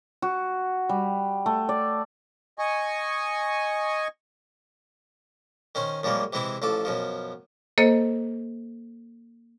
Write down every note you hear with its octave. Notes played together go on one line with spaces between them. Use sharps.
F#4
G3
A3
D5
D#5 G#5 C#6
D#3 C#4 C5
F#2 F3 G3 G#3 A#3
C3 E3 G#3 C4 E4
A1 F3 A4 D6
F#2 B2 F3
A#3 A4 C5 D#5